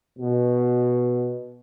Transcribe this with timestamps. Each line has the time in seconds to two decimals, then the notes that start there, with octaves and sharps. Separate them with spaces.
0.18 B2